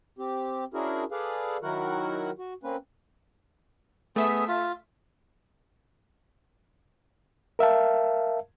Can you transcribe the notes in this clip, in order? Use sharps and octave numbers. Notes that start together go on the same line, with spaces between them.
C4 G4
C#4 D4 E4 F#4 G#4 A#4
G#4 A4 B4 D5 F5
D#3 F#3 E4 F#4 A#4 F#5
F#4
A#3 C4 C#4 B4
A3 B3 G#4 E5 B6
F4
A#4 E5 F5 A5